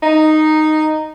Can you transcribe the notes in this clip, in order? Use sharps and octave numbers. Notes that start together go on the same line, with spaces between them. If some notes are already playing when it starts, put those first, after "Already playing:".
D#4